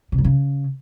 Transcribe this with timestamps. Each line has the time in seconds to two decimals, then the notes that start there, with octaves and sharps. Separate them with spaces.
0.12 C3
0.18 F#2
0.24 C#3